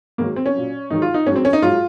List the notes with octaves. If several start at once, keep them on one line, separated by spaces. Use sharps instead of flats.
G#2 D#3 F#3 A#3
C4
C#4
A#2 F#3
G#2 D#3 F#3 D#4
F4
D#4
G#2 F#3 C#4
C4
C#4
D#4
G#2 F#3 F4